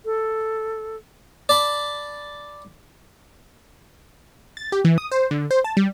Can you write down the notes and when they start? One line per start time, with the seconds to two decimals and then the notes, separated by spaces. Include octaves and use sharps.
0.05 A4
1.49 D5 A5 B5
4.57 A6
4.72 G4
4.85 E3
4.98 D#6
5.12 C5
5.31 D3
5.51 C5
5.64 A5
5.77 G3